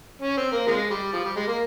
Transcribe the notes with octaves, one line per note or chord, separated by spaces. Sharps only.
C#4
C4
A#3
C3 F3 G#3
G3
F3
G3
G#3
A#3